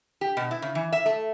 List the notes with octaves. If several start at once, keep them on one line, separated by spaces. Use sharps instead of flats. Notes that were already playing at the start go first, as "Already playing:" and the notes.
G4
B2
E4
C#3
E3
E5
A3